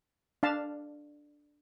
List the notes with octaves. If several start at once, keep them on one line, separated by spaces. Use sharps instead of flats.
D4 F5 A5